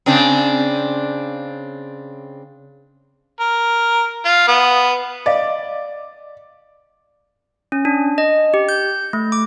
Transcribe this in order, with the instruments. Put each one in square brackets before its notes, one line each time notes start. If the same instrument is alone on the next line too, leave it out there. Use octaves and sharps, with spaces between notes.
[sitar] C#3 C4 D4
[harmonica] A#4
F4
B3
[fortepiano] D5 [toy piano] D#5 F5
[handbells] C#4
D4
D#5
G4
G6
A3
D6